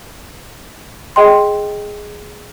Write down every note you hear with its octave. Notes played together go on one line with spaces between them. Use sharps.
G#4 D#5 G5 C6